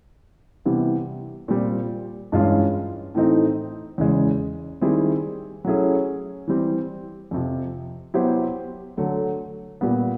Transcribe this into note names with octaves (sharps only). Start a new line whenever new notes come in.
C3 E3 G3 B3
A#2 G3 C4
G2 E3 G#3 C#4 F4
A2 E3 A3 C4 D#4
E2 C#3 E3 G#3
D#3 G3 C4 E4 G#4
F#3 A3 C#4 E4 G#4
E3 G3 C4
F2 C3 F3
F#3 B3 E4 G4 C5
D3 F#3 A3
A#2 G3 B3